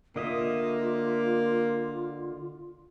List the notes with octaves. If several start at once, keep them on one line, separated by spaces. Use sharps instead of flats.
D3 A#3 F4 D#5 E5